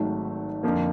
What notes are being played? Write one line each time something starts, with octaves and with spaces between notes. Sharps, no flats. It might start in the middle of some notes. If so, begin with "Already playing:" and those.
Already playing: G#1 G#2 D#3 F#3 A3
F2 D3 F3 A#3